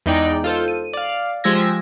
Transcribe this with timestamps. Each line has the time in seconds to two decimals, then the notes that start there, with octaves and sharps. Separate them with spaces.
0.06 E2 G#3 D#4 D5 G5
0.44 F4 A4 C5
0.68 D#7
0.93 D5 F5
1.44 F3 G#3 G4 E6 G#6 A#6